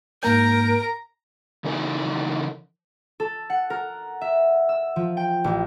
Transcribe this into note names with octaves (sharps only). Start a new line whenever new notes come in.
G#2 A#3 A#4 A#5 G6
C#3 E3 D#4 A4 A#4 G#5
A4
F#5
A#4
E5
E6
F3
G5
A1